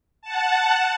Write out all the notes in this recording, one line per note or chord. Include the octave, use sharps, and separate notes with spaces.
F#5 A5